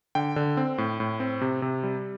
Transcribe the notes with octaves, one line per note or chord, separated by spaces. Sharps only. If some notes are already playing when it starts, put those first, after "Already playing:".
D3 G5
D3
C4
A2
A2
C4
C3
C3
G3